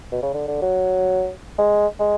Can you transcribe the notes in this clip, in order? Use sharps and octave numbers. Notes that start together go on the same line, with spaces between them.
B2
C#3
D3
D3
F#3
G#3
G#3